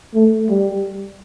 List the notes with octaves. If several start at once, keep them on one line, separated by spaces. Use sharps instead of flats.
A3
G3